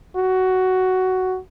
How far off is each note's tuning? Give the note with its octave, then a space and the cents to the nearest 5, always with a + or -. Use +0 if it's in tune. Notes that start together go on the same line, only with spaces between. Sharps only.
F#4 +10